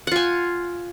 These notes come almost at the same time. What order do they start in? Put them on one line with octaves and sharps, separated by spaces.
F#5 F4 G#5